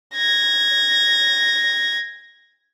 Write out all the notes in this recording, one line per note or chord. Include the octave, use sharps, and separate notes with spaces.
G#6 A#6